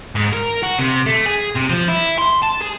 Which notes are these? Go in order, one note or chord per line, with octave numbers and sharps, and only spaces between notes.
G#2
A#4
F#4
C3
A3
G#4
C3
F3
E4
C6
A5
G#4